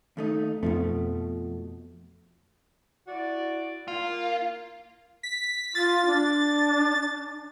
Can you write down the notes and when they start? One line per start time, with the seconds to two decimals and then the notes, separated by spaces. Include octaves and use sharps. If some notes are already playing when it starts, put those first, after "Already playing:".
0.17 D#2 A3 D#4
0.63 F2 B2 F3 A3
3.07 E4 F#4 D5
3.88 A#3 F4
5.23 B6
5.75 F4 A6
6.06 D4